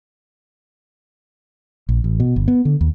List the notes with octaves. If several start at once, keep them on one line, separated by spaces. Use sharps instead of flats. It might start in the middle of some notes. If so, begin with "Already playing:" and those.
A#1
A1
B2
G1
B3
D3
D#2